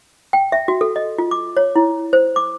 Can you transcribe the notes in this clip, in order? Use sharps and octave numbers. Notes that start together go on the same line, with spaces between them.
G5
E5
F#4
A4
D#5
F4
D6
C#5
E4
C5
D6